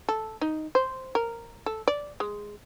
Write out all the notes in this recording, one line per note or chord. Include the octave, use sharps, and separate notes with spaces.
A4
D#4
C5
A#4
A4
D5
G#3